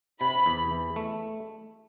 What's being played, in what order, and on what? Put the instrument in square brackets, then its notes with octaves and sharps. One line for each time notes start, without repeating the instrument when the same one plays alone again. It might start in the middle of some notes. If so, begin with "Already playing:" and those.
[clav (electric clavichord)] C3 [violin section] B5
[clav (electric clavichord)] E2
E3
A3